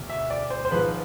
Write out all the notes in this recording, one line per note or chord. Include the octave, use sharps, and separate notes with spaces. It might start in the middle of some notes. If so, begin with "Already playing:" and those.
Already playing: E1 D2
E5
D5
C5
C5
G#1 G#2 F3 B4